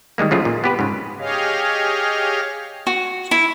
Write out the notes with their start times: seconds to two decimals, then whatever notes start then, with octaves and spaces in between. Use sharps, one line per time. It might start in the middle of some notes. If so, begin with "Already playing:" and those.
0.18 D#3 G3 G#3 A#3
0.31 C#3 F3 F#3 A3 F4 G#4
0.45 A#2
0.64 B3 G4 B4
0.79 G#2 C#3
1.19 G4 G#4 C#5 D#5 F5
2.87 F#4
3.31 E4